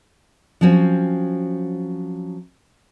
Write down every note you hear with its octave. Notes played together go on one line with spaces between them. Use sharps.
F3 F#3 C4 C#4